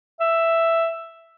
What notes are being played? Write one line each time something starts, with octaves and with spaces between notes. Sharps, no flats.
E5